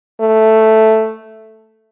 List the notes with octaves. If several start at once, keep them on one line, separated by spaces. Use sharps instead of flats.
A3